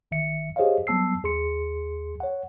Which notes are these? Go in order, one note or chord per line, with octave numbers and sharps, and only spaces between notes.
G1 D#3 E5 C#7
G4 G#4 C5 C#5 D#5 F5
F#3 G3 B3 A5 E6 C7
D#2 G#4 C6 C#7
C#5 F#5